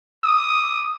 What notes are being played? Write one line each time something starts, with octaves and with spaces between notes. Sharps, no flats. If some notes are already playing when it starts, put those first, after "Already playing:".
D#6